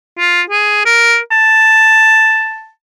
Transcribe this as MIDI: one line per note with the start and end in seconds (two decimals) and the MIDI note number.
0.18 0.42 65
0.50 0.85 68
0.85 1.18 70
1.31 2.70 81